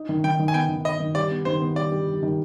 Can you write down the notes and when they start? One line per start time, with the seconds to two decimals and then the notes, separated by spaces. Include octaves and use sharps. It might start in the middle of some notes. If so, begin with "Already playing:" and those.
Already playing: D#4
0.09 D#3
0.24 D#3 G5
0.39 D#3
0.48 G#5
0.54 B3 G5
0.69 D#3
0.85 D#4 D#5
1.00 D#3
1.15 G3 D5
1.31 B3
1.45 D#3 C5
1.61 B3
1.76 G3 D5
1.92 G3
2.07 G3
2.23 D#3